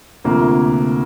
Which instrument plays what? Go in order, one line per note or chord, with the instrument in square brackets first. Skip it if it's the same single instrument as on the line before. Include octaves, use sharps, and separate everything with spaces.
[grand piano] D2 C3 F3 A#3